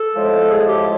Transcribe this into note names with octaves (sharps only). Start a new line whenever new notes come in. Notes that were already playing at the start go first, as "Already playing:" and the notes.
Already playing: A4
A2 F3 G#3
G#4
G4